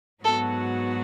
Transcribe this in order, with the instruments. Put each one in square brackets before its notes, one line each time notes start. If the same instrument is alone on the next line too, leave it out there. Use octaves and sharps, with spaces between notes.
[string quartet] G#2 F#3 B3 F#4 [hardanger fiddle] A4